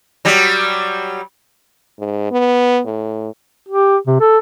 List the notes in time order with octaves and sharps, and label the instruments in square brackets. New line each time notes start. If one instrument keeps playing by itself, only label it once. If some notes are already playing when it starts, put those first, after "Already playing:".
[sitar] F#3 G3
[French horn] G#2
B3
A2
[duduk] G4
C3
A4